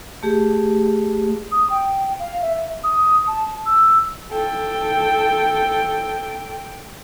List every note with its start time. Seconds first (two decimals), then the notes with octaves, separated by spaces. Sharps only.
0.23 A3 G4 G#4
1.52 D#6
1.70 G5
2.19 F5
2.42 E5
2.84 D#6
3.27 A5
3.66 E6
4.31 A4 G5